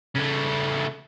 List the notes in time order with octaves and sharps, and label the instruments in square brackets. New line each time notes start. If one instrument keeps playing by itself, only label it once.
[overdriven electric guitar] C#3 A3